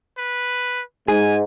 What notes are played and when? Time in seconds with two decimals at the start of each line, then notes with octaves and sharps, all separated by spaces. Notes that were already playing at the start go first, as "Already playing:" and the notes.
0.18 B4
1.08 G#2 G#4 G#5